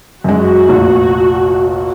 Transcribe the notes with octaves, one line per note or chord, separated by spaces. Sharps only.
F#2 G#3 F#4
F1 A#1